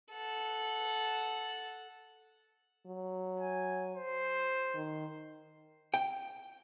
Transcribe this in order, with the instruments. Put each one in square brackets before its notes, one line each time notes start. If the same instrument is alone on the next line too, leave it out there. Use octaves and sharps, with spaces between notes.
[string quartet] A4 F#5
[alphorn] F#3
[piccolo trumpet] G#5
C5
[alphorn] D#3
[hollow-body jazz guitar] G5